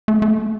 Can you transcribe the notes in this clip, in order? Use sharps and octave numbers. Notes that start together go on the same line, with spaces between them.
A3
A3